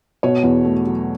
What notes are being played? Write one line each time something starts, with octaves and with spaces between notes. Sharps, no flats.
B2 C#5
E2
A3
F#3